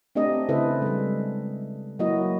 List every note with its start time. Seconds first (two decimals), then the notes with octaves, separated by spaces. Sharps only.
0.15 A3 C4 D4 G4 D#5
0.49 C#3 E4 A4 B4 C5 E5
0.82 G3 G#3
1.99 F#3 A#3 E4 F#4 D#5